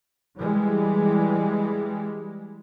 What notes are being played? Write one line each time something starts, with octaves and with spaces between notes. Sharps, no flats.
E3 G3 G#3